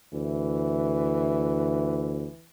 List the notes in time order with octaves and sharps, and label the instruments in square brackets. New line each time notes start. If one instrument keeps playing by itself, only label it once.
[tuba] D2 [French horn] E3